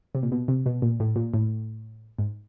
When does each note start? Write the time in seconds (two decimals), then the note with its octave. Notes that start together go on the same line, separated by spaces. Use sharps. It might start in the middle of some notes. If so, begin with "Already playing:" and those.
0.15 C3
0.23 A#2
0.32 B2
0.48 C3
0.66 B2
0.82 A#2
1.00 A2
1.16 A#2
1.34 A2
2.18 G#2